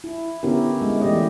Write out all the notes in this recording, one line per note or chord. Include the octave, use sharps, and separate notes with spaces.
E4
D3 B3 C#4 E4 G4 A#4
G#3
E3 A3 E4 G4 D5 D#5